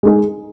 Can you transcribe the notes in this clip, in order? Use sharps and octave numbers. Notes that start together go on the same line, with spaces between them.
G#3 D#4 G#4